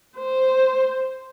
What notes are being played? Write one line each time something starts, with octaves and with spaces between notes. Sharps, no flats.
C5